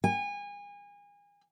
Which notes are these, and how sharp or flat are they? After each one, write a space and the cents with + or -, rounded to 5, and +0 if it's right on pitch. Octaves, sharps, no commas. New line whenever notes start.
G#5 -30